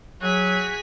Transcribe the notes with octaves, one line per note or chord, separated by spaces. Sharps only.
F#3 F#4 G#4 B6